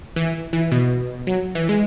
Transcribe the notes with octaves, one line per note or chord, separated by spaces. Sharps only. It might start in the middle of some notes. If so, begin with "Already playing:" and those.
E3
E3
B2
F#3
E3
G#3